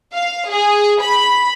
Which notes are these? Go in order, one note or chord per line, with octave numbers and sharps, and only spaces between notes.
F5
G#4
B5